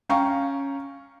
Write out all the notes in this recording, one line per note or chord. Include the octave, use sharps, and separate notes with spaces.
C#4 F5 G5 A#5 C#6